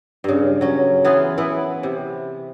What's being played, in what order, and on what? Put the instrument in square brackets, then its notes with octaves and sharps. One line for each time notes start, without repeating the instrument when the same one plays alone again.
[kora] G2 C#3
F#3 C#4
E3 B3 F4 G#4
E3 B3 E4
C3